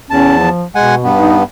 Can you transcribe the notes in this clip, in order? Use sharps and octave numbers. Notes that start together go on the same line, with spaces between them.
E2 C#4 A5
F3
B2 G#3 F#5 G#5
G2 B3
D#4